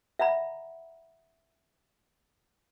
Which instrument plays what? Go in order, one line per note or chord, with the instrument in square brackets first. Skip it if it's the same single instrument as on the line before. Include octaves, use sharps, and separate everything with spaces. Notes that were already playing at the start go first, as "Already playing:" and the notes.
[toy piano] E5 F#5 A#5 B5